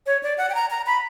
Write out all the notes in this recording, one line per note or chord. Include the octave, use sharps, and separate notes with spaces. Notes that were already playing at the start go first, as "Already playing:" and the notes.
C#5
D5
F#5
G5
A#5
A#5
B5